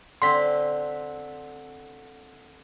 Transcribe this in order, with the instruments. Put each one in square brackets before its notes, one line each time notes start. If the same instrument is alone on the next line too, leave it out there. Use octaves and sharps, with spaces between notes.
[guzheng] D3 C4 [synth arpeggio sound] C6 B6